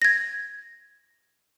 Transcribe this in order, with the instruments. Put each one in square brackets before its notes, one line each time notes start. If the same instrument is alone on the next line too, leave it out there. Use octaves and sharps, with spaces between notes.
[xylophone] G#6 A#6